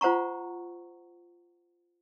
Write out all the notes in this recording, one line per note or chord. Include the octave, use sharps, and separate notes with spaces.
F4 C5 F#5 A#5 C#6